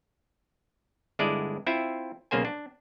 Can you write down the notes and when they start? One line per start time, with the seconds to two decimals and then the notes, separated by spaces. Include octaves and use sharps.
1.19 G1 G#3 D4 E4 D5 D#5
1.67 C4 E4 F4 E5
2.31 B1 C#3 A#3 C5 G#5
2.45 D4